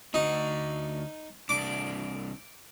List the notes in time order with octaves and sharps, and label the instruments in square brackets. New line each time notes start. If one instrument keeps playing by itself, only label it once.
[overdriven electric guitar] D2 F#4 [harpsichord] D#4
[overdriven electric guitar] C2 D4 [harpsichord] D6